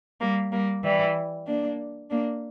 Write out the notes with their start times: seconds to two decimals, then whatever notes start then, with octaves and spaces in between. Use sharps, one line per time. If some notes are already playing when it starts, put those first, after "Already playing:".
0.21 G3 A#3
0.52 G3 A#3
0.84 E3 G3
1.47 A#3 D4
2.10 A#3 D4